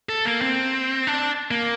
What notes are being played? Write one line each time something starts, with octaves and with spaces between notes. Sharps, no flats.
A4
A#3
C4
D4
A#3